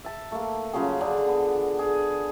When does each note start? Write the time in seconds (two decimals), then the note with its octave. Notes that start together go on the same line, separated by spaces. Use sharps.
0.04 E5 A5
0.32 A3 A#3
0.73 C#3 F3 F#3 G#4
1.01 D3 D4 G#4
1.27 B3
1.79 G#4